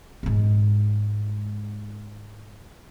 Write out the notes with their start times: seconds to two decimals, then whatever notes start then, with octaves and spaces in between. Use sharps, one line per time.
0.23 G#2 G#3